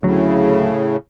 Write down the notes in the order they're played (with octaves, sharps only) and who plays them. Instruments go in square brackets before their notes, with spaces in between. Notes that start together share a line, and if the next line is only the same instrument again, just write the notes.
[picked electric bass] D2 F#3 [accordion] A2 C#3